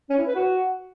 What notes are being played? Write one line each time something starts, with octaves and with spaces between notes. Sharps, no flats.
C#4
E4
B4
F#4